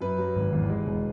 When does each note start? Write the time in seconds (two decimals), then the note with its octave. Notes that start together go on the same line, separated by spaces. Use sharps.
0.01 F#2 B4
0.18 F#3
0.36 G#1
0.53 E2
0.70 G#3
0.86 E1